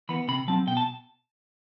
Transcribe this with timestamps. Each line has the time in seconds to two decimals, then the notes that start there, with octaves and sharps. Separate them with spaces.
0.09 E3 B3 B5
0.28 C3 B5
0.48 F#3 C4 A5
0.67 B2 G5
0.77 A5